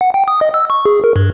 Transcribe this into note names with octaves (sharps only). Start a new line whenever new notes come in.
F#5
G5
D#6
D#5
E6
C#6
G#4
A#4
G2